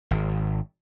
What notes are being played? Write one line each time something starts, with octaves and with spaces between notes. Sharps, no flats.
G#1